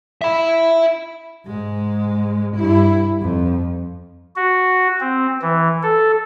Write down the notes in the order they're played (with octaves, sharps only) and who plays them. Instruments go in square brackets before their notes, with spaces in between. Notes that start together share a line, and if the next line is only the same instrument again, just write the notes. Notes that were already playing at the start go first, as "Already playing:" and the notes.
[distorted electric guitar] E5 B5
[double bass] G#2 G#3
G2 E4
F2
[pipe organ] F#4
C4
E3
A4